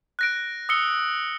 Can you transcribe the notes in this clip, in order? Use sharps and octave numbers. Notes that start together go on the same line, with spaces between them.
F#6 A#6 D7
D#6 E6 C#7 G7